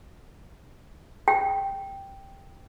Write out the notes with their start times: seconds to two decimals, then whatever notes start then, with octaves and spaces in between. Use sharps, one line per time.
1.28 G5